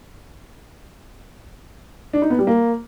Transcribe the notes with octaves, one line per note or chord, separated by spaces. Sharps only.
D4
D#4
B3
G3
A#3